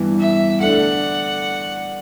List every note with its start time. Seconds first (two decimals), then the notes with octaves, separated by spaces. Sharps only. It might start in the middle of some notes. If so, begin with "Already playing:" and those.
Already playing: G2 E3 B3
0.19 E5
0.60 D3 A3 D4 F#5